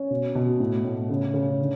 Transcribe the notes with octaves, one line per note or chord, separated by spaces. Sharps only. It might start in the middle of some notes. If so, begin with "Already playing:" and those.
Already playing: C#4
B2
B2
A2
A2
C#3
C#3
D3